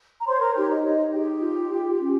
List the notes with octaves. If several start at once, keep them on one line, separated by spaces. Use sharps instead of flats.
A#5
C5 C#5 C6
C6
A#4 A#5
D#4 G4 G5
D#5
D#4 D#5
G4 G#4 G5
F4
F4
C#4